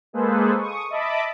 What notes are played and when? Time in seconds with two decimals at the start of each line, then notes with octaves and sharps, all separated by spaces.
0.13 G#3 A#3 G#4 A4 B4 C5
0.57 C#6 D#6
0.90 D#5 E5 A5 B5 D6